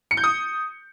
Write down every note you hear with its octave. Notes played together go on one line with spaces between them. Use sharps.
C#7
G6
D#6